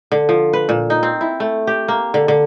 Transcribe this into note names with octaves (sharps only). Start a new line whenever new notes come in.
D3
F3
B4
A#2
D#4
C4
E4
A3
G4
A#3
D3
D3